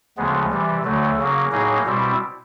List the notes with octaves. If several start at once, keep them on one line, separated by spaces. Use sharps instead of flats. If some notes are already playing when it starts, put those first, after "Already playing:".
D2 C#3 F3 G#3 B3
C3 E3 G3
D2 D3 F#3 A3
C#3 F#3 A#3
A2 F#3 A#3 D#4 G#4
B2 G3 C4 E4